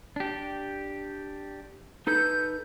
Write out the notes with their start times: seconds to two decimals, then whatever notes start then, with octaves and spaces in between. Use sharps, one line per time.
0.16 D4 G4
2.07 D#4 A4 B4 G6